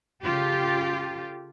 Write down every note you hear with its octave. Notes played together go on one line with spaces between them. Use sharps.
C#3 F4 G4 A4